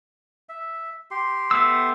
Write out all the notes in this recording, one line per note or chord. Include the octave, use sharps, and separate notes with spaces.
E5
G4 C6
A3 B3 E6